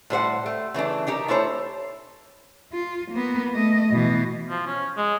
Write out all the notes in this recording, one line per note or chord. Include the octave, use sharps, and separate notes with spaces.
A2 G3 C5 F#5
A3
C#3 E3 A3 D4
D4 D#4 G4 A#4
A3 E4 A4 C5 C#5
F4
A#3 B3
A3 D#5
B2 E3
F3
C#4
G#3